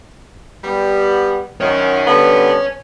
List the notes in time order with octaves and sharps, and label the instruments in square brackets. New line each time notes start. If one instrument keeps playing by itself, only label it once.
[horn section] G3 B3
[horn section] F#2 D#3 [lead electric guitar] C#5 G#5
[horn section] D3 G3 B3